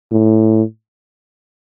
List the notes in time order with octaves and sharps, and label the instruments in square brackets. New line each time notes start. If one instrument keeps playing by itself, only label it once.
[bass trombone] A2